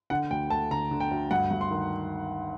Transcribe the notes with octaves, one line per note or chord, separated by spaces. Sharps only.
D3 F#5
D2 G5
D2 A5
D3 A#5
D3
G5
D2
G2 F#5
G2
C6
D#3